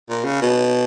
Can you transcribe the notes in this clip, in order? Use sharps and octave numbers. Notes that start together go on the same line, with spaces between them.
A#2
C#3
B2